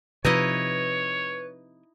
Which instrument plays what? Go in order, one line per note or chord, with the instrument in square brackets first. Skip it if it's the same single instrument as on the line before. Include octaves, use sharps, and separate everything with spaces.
[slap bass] C3 F3 [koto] D#4 E4 D#5 [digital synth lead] B4 [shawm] C#5